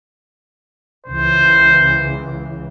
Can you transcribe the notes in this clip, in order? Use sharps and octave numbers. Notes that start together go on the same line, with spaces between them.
C#2 C#3 E3 C5